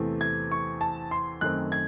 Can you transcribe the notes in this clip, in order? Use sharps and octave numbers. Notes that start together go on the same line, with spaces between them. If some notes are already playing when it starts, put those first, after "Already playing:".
Already playing: E2 C3 E3 A3 C4
G#6
C#6
A5
C6
F#2 D#3 A3 C4 F#6
G#6